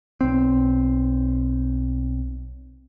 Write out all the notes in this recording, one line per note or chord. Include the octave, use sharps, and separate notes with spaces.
B1 C4